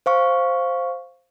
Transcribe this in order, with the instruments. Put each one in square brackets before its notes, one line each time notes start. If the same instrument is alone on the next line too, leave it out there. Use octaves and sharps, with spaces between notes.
[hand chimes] C5 F5 C#6